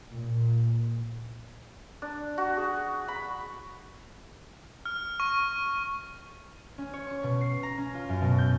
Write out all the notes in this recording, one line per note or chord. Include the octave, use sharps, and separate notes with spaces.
A#2
D4
F#4
G#4
B5
F6
C#6
C#4
C#5
C#6
B2
C7
A#5
C#4
F4
F#2
B2
G6